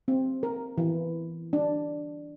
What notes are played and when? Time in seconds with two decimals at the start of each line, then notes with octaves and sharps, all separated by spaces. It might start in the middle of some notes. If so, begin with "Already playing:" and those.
0.08 C4
0.43 A#4
0.78 E3
1.53 D4